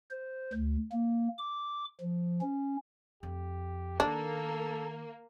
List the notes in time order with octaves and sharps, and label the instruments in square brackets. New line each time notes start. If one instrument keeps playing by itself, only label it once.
[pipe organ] C5
D2
A#3
D6
F3
C#4
[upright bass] F2 [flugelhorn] G4
[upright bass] D#3 [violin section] A#3 [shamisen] D4 [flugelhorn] A4